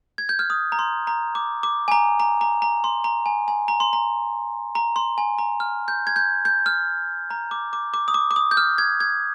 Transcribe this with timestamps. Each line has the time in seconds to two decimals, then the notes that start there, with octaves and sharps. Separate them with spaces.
0.18 G#6
0.29 G6
0.39 F6
0.50 D#6
0.72 A#5
0.79 C6
1.07 A#5
1.35 D6
1.63 D6
1.88 G#5
1.92 A#5
2.20 A#5
2.41 A#5
2.62 A#5
2.84 C6
3.04 A#5
3.26 G#5
3.48 G#5
3.68 A#5
3.80 C6
3.93 A#5
4.75 A#5
4.96 C6
5.18 G#5
5.39 A#5
5.60 F6
5.88 G6
6.07 G#6
6.16 G6
6.45 G6
6.66 F6
7.30 A#5
7.51 D6
7.73 D6
7.94 D6
8.08 D#6
8.14 D6
8.31 D6
8.36 D#6
8.51 G6
8.57 F6
8.78 G#6
9.00 G#6